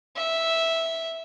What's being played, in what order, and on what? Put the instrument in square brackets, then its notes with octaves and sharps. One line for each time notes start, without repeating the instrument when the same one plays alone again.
[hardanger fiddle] E5